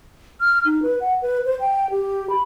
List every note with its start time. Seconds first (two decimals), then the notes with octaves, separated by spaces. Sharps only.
0.41 F6
0.65 D#4
0.83 B4
1.01 F#5
1.22 B4
1.45 C5
1.60 G5
1.91 G4
2.30 B5